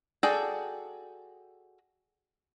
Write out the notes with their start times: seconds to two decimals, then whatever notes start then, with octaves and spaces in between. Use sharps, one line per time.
0.23 F#4 G#4 A4 D5 G5